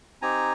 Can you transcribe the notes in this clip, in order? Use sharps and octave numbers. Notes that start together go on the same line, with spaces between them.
C4 D#4 G4 G#5 A#5